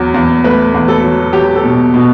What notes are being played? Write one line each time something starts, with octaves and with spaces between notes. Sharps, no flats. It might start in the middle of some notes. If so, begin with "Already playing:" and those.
Already playing: E2 F#3
E2
A3 B4
E2
A4
F#3
F#3 G4
A4
B2
B2